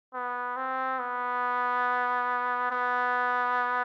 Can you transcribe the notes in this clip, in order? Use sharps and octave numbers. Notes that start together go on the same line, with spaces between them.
B3
C4
B3
B3